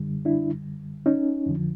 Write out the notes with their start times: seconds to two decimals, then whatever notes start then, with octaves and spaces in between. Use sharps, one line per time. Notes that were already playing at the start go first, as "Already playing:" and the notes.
Already playing: F#2 D3 G3
0.25 D4 E4
1.06 C#4 D#4
1.46 F2 D3 F3